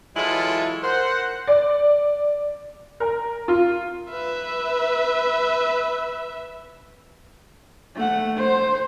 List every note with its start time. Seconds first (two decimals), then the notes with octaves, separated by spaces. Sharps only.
0.16 E3 F#3 G#3 E4 F4 A4
0.84 A#4 C5 F#5
1.47 D5
3.00 A#4
3.48 F4
4.11 B4 E5
7.95 A3 F#5
8.36 C5